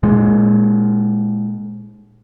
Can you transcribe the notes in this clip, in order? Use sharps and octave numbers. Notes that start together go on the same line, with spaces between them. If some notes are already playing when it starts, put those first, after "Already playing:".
A#2 G#3